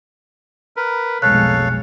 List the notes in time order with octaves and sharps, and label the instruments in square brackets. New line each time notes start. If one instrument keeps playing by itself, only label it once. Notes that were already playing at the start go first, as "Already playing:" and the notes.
[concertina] A#4 B4
[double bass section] F1 B1 G#3 [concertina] A4 C#5 F5 [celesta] F#6